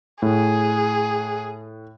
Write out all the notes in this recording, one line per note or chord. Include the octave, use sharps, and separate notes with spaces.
A2 G#4